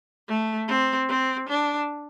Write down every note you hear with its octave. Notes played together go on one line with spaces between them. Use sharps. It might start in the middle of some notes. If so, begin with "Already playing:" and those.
A3
C4
C4
D4